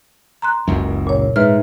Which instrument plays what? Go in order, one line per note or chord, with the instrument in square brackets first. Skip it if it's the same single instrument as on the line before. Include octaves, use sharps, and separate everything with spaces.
[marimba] A#5 C6 F#6
[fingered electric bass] F#1 C#2 F#2
[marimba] A#2 C#5
[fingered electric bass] G#2 [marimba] B4 E5 F6